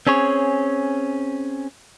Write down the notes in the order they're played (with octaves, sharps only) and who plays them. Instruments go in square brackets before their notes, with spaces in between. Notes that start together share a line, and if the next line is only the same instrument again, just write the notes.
[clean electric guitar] C4 C#4 G#4 C#5